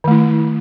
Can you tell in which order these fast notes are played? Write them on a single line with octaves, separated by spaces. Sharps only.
D#3 A3 E4